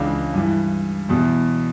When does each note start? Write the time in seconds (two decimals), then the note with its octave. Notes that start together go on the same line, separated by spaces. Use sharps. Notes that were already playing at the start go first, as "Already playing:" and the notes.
Already playing: C#2 C#3 E3 D4
0.33 G2 E3
1.09 E2 B2